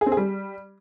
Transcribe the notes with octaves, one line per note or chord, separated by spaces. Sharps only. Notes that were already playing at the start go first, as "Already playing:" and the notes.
G#4
C4
G#4
G3